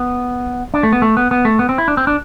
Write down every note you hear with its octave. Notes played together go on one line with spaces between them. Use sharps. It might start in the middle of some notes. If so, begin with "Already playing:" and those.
Already playing: B3
D4
A3
B3
A3
B3
B3
A3
B3
C4
E4
D4
C4
D4